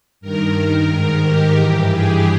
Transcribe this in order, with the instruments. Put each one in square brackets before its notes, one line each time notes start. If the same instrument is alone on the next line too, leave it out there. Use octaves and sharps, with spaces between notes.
[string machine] G2 D#3 A#4
G#2 D#3
G4
G2 E3
G#4